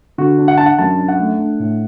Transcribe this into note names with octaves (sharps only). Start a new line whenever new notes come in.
D3 F#4
D4
F#5
D4 A5
F#5
F#2 A5
D4
F#5
A3
D4
A2